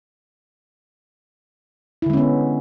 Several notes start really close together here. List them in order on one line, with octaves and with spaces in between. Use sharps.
E4 D3 G#3 C#4 B3